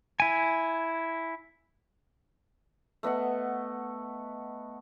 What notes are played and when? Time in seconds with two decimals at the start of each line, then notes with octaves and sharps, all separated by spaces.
0.20 E4 G#5
3.03 A3 B3 D#5 F#5